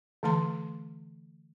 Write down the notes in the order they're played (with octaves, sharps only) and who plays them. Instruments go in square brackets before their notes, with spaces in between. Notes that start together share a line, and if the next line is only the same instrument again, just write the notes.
[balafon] D3 E3 A3 A5 C6